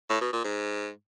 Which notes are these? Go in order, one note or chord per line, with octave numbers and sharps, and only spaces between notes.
A2
B2
A#2
G#2